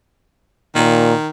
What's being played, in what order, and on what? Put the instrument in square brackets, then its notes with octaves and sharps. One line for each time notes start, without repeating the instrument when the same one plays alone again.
[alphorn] A#2 [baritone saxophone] D#3